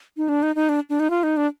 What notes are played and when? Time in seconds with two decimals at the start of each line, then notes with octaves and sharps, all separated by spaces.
0.17 D#4
0.29 D4
0.43 D#4
0.55 D#4
0.69 D4
0.90 D4
1.00 D#4
1.10 F4
1.23 D#4
1.37 D4